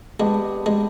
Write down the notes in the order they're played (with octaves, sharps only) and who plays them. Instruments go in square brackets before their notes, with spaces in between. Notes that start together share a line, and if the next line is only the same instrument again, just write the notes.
[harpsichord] G#3 [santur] B3 D4 G4
[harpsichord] G#3